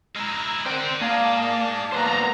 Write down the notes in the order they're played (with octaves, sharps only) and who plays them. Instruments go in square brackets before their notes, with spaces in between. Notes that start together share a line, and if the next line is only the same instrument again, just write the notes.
[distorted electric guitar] G#3 E4 [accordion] A#5 E6 F6
[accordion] A#4 [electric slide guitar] C5 G5 [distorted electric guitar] D5 F#5
[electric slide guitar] A#3 [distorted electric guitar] D#4 G#4 [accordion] D5 F5 A5
[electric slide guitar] A#3 B3 C5 [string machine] A#5